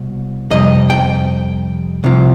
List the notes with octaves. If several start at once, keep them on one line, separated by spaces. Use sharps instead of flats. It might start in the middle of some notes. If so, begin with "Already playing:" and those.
Already playing: C2 B2
F2 C3 G3 D#5
G5
C2 C3 F3